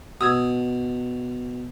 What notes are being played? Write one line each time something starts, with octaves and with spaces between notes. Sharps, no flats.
B2 D#6 E6 G#6